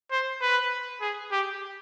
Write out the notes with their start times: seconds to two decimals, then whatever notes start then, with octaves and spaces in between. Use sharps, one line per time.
0.11 C5
0.42 B4
1.01 G#4
1.32 G4